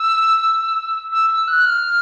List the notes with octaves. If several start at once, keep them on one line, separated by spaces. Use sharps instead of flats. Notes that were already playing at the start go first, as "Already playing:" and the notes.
Already playing: E6
E6
E6
F#6
F6